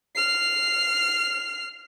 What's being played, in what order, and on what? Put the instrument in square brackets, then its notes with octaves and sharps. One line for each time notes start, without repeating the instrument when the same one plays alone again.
[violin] F6 C7